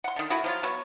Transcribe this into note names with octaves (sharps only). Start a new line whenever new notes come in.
F#5 C6
D3 D#3
A3 E4 F#4 G#4
F3 F#3 F4
F#3 B3 C#6